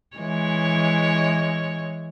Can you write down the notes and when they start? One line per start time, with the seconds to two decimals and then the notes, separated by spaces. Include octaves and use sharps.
0.17 E3 G#3 C#5